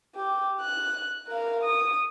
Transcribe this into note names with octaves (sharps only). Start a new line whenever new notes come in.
G4
F#6
A#4 F5
D#6